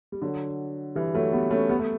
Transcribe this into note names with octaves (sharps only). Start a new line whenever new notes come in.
G3
D3 F#3
E3 G3
F#3 A3
G3 B3
A3 C#4
G3 B3
A3